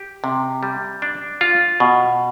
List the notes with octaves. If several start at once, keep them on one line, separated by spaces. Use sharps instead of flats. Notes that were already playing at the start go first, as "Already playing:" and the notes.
Already playing: G4
C3
G3
D4
F4
B2